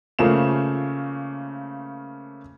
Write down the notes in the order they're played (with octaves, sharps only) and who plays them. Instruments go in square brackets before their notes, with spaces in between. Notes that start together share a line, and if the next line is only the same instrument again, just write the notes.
[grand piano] C#3 F3 A3 A#3 E7